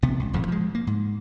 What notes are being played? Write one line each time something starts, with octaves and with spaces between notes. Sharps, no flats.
A#1 C3 B3
C#2
D#1 F2 A2 C#3
F3 G#3
A#3
G#2